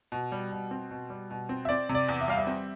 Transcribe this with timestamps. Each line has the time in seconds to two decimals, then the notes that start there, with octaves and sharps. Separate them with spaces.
0.12 B2
0.32 G3
0.52 B2
0.71 C4
0.91 B2
1.10 G3
1.31 B2
1.49 C4
1.65 E5
1.69 C4 D5
1.89 C3
1.95 D5
2.09 E2
2.21 E5
2.28 G3 F5
2.37 E5
2.47 C4